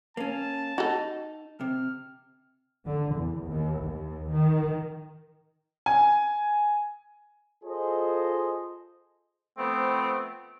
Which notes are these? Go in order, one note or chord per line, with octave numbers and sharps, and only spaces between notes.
A#3 C#4 A5
D#4 F#4 A4
C3 F6
D3
E2
D#2
D#2
D#3
G#5
F4 G#4 A4 C5 D#5
F3 A3 B3 C4